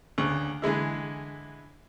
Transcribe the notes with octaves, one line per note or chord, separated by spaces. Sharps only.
D2 C#3 C#6
D3 E3 G#3 E4